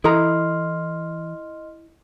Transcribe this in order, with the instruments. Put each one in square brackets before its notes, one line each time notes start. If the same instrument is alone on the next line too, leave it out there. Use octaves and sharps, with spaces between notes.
[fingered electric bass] E3 [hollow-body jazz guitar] E4 A#5 [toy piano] A4 [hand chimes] D#5 C6 F6